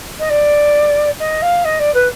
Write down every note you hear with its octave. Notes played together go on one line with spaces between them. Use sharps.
D#5
D5
D#5
F5
D#5
D5
B4